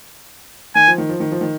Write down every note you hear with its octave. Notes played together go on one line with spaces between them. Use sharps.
D#3 G#5
F3
D#3
F3
D#3
F3
D#3